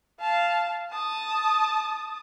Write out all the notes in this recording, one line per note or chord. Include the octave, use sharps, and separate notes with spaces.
F5 A5
A5 D#6